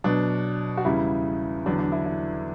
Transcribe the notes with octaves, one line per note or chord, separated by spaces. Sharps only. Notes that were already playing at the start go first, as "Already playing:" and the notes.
B2 F#3 D4
F#4
E2 C#3 G3 E4
E2 D3 F#3 D4
D4
E4
E4